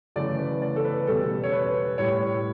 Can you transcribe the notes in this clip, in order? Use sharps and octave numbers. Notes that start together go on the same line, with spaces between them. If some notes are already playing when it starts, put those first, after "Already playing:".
F#2 C#3 E3 A3 D5
B4
D5
A4
B4
E2 B2 G3 A4
C#5
B4
A2 G3 C#5